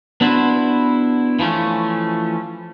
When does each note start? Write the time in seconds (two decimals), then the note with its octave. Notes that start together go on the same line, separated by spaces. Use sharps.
0.21 B3 D4 E4 F#4 B4 C5
1.39 E3 F3 G3 A3 C#4